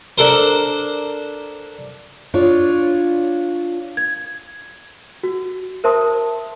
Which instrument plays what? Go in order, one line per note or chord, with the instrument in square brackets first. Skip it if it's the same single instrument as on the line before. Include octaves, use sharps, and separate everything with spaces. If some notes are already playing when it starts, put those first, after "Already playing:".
[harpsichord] D4 A4 A#4 C5
[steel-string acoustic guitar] D4 F4 C#5
[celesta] G#6
F#4
A#4 C5 E5 A5 C6 D#6